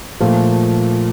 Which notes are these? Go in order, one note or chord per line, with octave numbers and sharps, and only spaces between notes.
A#2 F3 A3